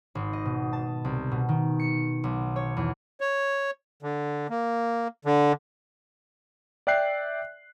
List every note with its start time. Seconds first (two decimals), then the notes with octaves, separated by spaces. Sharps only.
0.15 G#1
0.33 D#5
0.45 B2
0.73 A5
1.05 C2
1.31 B2
1.49 D#3
1.79 C#7
2.24 B1
2.56 C#5
2.77 E2
3.21 C#5
4.03 D3
4.49 A#3
5.25 D3
6.87 D5 E5 G5 F#6 C7